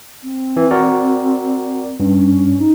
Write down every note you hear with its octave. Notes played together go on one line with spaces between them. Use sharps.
C4
E3
F#4 A#4 D5
G2 C#4
D#4